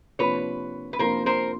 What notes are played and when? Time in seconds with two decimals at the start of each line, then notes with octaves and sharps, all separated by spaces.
0.19 C3 F3 A#3 D4 F4 B4 C#5
0.93 B4
0.99 C3 F3 A#3 D4 F4 A#4 C5
1.26 A#4 C5